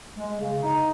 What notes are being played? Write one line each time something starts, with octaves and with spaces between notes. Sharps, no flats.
G#3
C#3
D#4